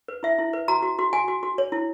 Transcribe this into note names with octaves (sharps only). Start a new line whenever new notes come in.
B4
E4 E5
E4
B4
F#4 A#5
F#4
F#4
F#4 G#5
F#4
F#4
C#5
E4